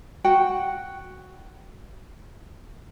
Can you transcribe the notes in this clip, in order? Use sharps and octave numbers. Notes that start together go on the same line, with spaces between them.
F#4 F#5 G5